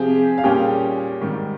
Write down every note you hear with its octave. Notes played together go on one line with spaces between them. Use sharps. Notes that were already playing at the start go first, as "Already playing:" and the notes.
Already playing: C3 F3 C4 G4 G#4 G#5
F5
A#2 G3 A#3 C#4 G4 G#4 G5
G#2 D#3 G3